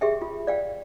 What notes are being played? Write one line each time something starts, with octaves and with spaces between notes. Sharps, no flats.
G4 G#4 E5 G5
F4
D5 F5 G5